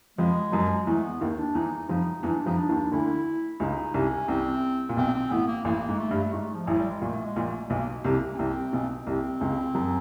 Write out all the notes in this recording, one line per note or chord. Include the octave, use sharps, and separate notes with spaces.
F2 F3 G#3
F#2 F#3
E2 E3 A3
B3
D#2 D#3
D4
E2 E3 D#4
F2 F3 D#4
E2 E3 D4
F2 F3 D#4
D4
D#2 D#3
D2 D3 E4
C#2 C#3 D#4
C2 C3 C#4
C2 C3 C4
A#2
B1 B2 C4
C4
A1 A2 B3
A#3
A1 A2 A#3
G#2
A3
G2
G#2 A3
F3
A1 A2 F#3
G3
G#3
A#1 A#2 A3
G#3
A#1 A#2
A3
B1 B2 A#3
C2 C3
C#4
C2 C3 C4
B1 B2
C2 C3 C4
C#2 C#3
F#2 F#3